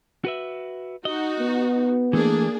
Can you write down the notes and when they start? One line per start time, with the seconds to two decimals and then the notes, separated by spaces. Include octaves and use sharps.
0.25 F#4 B4 E5
1.05 D#4 F#4 D#5
1.39 B3
2.13 E3 A3 A#3 D4 G#4